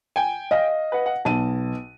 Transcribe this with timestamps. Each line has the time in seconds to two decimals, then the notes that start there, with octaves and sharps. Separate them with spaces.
0.16 G5 G#5
0.51 D#5 F5 A#6
0.92 B4 F#5
1.06 F#5
1.25 B1 A5 D#7